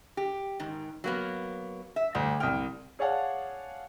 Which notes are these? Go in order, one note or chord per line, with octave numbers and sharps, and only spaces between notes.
G4
G#2 D#3
F#3 A#3 B3
E5
D2 G3
C2 G5 F6
G#4 C#5 D5 F5 F#5 A5